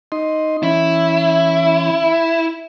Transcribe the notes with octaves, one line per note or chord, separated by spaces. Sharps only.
D#4 D#5 C6
E3 C#4 E4